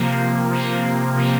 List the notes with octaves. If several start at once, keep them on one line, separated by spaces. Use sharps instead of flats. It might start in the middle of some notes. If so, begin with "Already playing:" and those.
Already playing: C3 F3 A#3
C3 F3 A#3
C3 F3 A#3